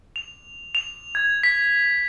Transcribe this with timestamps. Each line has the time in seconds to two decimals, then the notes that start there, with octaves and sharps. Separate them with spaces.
0.16 F7
0.75 F7
1.15 G#6
1.43 B6